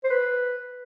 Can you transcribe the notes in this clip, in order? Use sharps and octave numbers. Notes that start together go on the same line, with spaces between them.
C5
B4